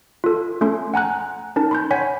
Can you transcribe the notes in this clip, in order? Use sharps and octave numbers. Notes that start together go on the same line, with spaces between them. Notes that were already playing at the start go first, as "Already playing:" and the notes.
F4 A4
A3 C#4 A4 C6
F#5 G#5 A#5 F#6
C#4 D#4 A#4 A5
B5 C6 G6
C#5 F#5 G#5 G#6 B6